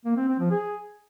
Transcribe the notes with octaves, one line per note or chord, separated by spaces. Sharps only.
A#3
C4
C4
F3
G#4